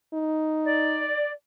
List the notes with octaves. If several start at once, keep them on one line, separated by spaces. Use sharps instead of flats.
D#4
D5